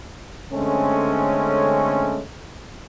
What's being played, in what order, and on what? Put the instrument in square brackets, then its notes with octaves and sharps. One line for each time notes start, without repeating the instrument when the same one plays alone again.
[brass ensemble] D3 G#3 A3 C4 C#4